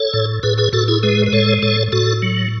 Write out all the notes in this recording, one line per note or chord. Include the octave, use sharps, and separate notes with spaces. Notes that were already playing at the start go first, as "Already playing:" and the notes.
Already playing: A4 C#5
A2
A2 G#4 B4
G#4 B4
A2 F#4 A4
E4 G#4
G#3 G#4 B4
B4
A2 A4 C#5
A2 A4 C#5
A2 F#4 A4
F#3